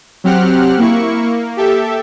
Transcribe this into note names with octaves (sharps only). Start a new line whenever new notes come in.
F#3 C4 G4 F#5 F6 F#6
A#3 E4 C#6
A#3
G4 A4 E5